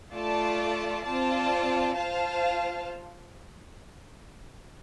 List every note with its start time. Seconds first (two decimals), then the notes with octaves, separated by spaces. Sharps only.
0.14 A3 F4 D5 A5
1.05 C4 F4 D5 A5
1.97 F4 C5 F5 A5